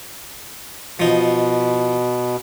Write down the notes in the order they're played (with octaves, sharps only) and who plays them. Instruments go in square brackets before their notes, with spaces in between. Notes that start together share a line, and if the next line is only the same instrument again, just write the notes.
[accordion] B2 [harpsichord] F3 D#4